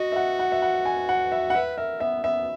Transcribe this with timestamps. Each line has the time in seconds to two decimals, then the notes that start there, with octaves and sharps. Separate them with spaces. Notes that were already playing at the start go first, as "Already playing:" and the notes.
Already playing: F#4 D#5
0.12 E5
0.16 F#5
0.39 F#5
0.52 E5
0.62 F#5
0.85 G#5
1.09 F#5
1.32 E5
1.50 F#5
1.55 B4 E5
1.77 A#4 E5
2.00 B3 E5
2.24 B3 E5